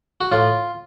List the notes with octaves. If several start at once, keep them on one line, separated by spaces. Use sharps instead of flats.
F#4
A2 F4